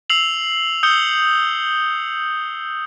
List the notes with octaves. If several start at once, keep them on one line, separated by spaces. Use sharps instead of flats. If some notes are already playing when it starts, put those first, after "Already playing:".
E6 C7 F7 F#7
D#6 E6 G6 C#7 F7 G7